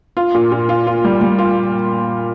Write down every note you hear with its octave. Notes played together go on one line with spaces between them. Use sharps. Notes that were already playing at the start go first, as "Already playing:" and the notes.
F4
A#2
A#2
F4
F4
G3
G3
F4